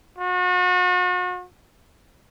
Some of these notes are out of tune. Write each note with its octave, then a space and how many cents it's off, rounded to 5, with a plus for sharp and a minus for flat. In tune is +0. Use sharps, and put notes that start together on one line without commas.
F#4 -40